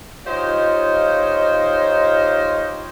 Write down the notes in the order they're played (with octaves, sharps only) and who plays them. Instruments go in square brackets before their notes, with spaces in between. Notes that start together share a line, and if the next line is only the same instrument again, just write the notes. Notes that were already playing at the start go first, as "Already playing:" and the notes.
[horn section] D#4 F4 G4 C5 C#5 D#5